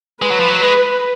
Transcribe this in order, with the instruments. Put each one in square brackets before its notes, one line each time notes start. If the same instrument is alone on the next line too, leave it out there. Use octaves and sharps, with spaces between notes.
[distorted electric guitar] G#3 [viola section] B4
[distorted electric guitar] F#3
F3
F#3
G#3